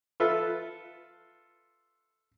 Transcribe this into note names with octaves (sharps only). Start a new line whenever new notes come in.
F4 A4 B4 E5